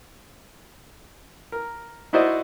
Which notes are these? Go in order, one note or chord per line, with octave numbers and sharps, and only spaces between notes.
A#4
D#4 E4 F#4 C5 D5 D#5